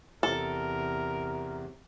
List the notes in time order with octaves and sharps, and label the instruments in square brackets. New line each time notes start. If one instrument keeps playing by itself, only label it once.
[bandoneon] E2 C3 [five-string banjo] A4 [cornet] A#4